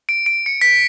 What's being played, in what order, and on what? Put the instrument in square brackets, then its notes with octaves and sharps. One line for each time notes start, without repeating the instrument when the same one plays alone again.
[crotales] D7
D7
C#7
B6